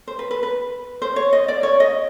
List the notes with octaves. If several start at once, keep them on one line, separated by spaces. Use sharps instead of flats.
C5
B4
B4
B4
C5
C#5
D#5
D5
C#5
D#5